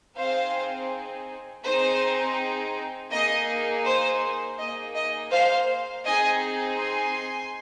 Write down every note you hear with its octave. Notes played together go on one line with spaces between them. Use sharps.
C4 D#4 G#4 C5 F5
C4 D#4 G#4 C5
A#3 D#4 G#4 D#5
C5
A#3 D#4 G#4 D#5
D#5
C5 F5
C4 D#4 G#4 D#5 G#5
G#5 C6